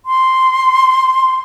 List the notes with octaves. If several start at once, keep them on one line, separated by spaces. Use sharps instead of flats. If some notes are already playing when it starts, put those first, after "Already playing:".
C6